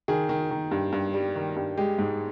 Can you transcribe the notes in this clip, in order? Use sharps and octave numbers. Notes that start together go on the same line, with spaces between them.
D#3 G#4
D#3
D#3
G2
G2
G3
D#3
G2
G#3 G4
G#2